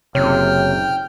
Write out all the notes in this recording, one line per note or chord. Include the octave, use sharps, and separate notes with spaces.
F#1 C3 C#5 G5 F6